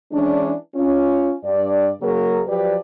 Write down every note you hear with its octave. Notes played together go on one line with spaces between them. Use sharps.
E3 G#3 C#4 D4
C#4 F4
G2 D5
F#2 C#3 F#3 A#3 G#4 A#4
F3 F#3 G4 B4 D5